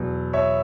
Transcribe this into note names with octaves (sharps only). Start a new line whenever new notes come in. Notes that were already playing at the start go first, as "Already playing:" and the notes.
Already playing: E2 B2 F#3
C#5 E5